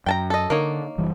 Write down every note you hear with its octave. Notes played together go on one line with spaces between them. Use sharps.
F#2 G5 A5 A#5
A4 D#5
D3 A#3 D#4 C#5
F#1 E3 G3